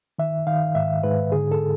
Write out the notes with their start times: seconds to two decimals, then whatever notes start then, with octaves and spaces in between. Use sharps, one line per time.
0.19 D#3 E5
0.47 D#3 F5
0.75 G#2 E5
1.04 G#2 B4
1.32 D3 G#4
1.52 A4